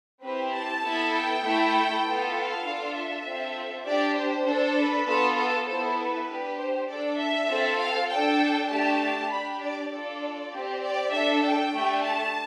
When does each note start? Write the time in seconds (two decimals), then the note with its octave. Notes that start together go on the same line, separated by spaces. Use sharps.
0.22 C4 E4 G4 B4
0.53 A5
0.83 B3 E4 A4
1.13 G5
1.43 A3 E4 A4
2.04 B3 F4 A4
2.34 F5
2.64 D4 F4 A4
2.95 E5
3.25 C4 F4 A4
3.86 D4 G4 D5
4.16 C5
4.46 D4 A4
4.77 B4
5.07 B3 F4 A4
5.37 A4
5.67 B3 E4 A4 C5
5.97 B4
6.29 D4 G4
6.58 C5
6.89 D4 A4 D5
7.19 E5
7.49 C4 F4 A4
7.80 F5
8.09 D4 A4 G5
8.70 A3 D4 G4 A5
9.31 D4 G4 B5
9.62 D5
9.91 D4 F4 A4 D5
10.52 C4 G4
10.83 D5
11.12 D4 A4 E5
11.43 G5
11.74 A3 D4 G4
12.03 A5